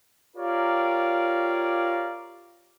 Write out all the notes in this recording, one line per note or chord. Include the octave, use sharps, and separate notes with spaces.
F4 G4 A#4 C#5 D5 F5